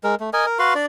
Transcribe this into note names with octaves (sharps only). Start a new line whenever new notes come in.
G#3 A#4
A3
A#4 D#5 G#5
A#4
F#4 B4 F5 C6
D4 D5